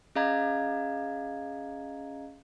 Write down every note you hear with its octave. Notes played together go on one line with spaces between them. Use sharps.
C#4 G#4 D#5 F5 A#5 G#6